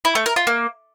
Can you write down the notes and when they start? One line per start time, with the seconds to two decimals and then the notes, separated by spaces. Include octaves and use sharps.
0.05 E4
0.15 A3
0.26 A#4
0.36 F4
0.47 A#3